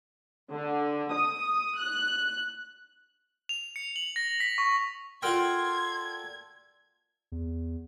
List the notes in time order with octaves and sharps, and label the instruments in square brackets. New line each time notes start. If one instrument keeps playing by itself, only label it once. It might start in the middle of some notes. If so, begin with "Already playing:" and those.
[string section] D3
D#6
F#6
[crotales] F7
C#7
F#7
A#6
B6
C#6
[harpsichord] F4 F#4 G5 [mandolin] A4 A#4 D5 [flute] C6 [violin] G#6
[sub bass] E2